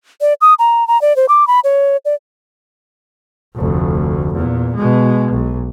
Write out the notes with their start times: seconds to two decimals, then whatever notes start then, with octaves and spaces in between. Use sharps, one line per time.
0.21 D5
0.41 D#6
0.59 A#5
0.88 A#5
1.02 D5
1.16 C5
1.29 D6
1.47 B5
1.64 C#5
2.05 D5
3.56 F1 D2
4.34 E2 A#2
4.75 B2 G#3
5.32 B1